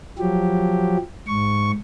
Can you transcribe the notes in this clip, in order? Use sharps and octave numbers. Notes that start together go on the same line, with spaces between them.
F3 F#3 G4
G#2 C#6